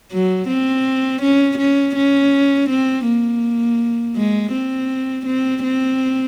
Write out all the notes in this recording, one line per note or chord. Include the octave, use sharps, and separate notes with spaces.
F#3
C4
C#4
C#4
C#4
C4
A#3
G#3
C4
C4
C4